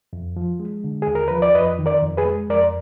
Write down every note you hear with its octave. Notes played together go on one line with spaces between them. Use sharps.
F2
F3
G#3
D3
D#2 G#4
A#4
F3 B4
D5
F2 B4 D#5
D#3
A#4 D5
F2
G#4 B4
G#3
F2 A#4 D5